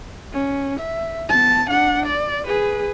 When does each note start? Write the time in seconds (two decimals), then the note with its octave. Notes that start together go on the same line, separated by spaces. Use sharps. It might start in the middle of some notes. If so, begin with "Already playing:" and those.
0.33 C#4
0.80 E5
1.29 B3 A5
1.69 D4 F#5
2.06 D5
2.46 G#4 B4